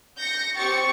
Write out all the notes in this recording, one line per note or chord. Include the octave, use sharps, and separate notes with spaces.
G6 A#6 C#7
C4 G4 C#6 A6 C#7